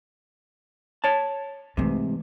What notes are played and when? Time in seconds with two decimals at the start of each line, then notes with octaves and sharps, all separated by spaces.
1.04 C#5 A5
1.77 G#2 C3 E3 A3